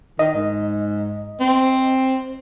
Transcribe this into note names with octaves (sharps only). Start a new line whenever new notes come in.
D#3 D#5
G#2
C4